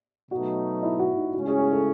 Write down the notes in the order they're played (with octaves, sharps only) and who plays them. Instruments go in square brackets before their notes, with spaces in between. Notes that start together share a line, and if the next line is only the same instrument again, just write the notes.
[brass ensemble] B2 F#3 A3 D#4 [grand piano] F#4
[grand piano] E4
F#4
D#4
[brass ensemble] C#3 G#3 C#4 E4 [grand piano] F#4
[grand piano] G#4
G#4
A4